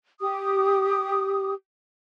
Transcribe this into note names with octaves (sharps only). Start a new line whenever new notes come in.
G4 D6 D#6